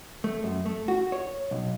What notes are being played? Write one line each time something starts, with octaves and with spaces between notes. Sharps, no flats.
A3
F#2
A3
F#4
C#5
B1